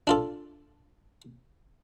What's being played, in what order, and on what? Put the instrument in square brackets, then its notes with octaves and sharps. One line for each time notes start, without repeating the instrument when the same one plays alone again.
[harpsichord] D4 F4 A4